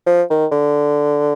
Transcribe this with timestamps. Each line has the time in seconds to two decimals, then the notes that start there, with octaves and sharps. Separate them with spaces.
0.06 F3
0.30 D#3
0.52 D3